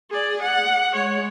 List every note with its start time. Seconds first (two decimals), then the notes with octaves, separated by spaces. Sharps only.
0.11 G#4 D5
0.43 F#5
0.94 G#3 C#5